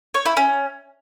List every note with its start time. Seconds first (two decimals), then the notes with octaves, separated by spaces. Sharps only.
0.14 C#5
0.26 E4
0.37 C#4